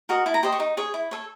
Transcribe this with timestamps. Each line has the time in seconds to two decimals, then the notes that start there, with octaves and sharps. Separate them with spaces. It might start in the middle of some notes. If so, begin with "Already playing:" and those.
0.09 F#4 A#4 D#5
0.26 E4 A5
0.34 A#5
0.43 G4 C5 D#5 C6
0.52 C#6
0.60 D#4
0.77 G#4 C#5
0.94 E4
1.11 A4 C#5